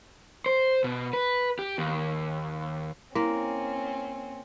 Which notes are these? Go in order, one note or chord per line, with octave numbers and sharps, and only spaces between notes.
C5
B2
B4
G4
D#2
A#3 C4 C#4 E4